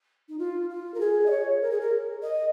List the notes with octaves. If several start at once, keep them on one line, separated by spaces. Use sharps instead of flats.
D#4
F4
F4
A#4
G#4
D#5
C#5
A#4
G#4
A#4
D#5